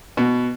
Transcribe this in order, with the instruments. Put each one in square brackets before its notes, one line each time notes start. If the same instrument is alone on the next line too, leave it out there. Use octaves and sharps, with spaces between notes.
[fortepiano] B2